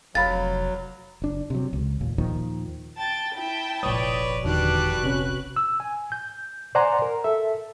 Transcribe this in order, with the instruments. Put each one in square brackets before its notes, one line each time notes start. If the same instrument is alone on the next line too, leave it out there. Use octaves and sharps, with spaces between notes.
[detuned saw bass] F1 [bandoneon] F#3 [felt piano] F5 B5 [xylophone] A6
[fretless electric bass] F#1 D4
C3 F#3
C#2
D#2 A#2
D#2 A#2 D#3 F3
[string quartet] G5 A5 A6
E4 G5 A5
[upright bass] F1 A#1 [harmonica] B4 C#5 D5 [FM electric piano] D#6
[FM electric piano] E2 D3 D#3 [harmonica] G3 D4 [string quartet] F#4 B4 F#6
[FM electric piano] C3 C#4
[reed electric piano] E6
G#5
G6
C5 D5 F#5 G#5 A#5 C6
A#4
A4 E5